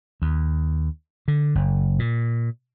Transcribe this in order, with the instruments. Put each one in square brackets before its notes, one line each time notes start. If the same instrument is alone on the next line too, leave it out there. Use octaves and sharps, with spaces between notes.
[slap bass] D#2
D3
F#1
A#2